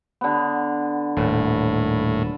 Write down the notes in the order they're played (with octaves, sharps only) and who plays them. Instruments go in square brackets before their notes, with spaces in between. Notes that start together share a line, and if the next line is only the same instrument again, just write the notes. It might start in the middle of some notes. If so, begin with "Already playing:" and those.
[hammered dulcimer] D3 B3
[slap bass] D#1 [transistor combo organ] A2